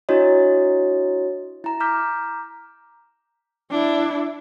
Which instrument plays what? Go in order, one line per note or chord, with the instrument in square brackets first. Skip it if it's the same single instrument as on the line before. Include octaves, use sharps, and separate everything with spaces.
[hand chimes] D4 E4 F#4 C#5 D#5
E4 A#5
A#5 D6 F6 G6 B6
[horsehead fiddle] D4 E4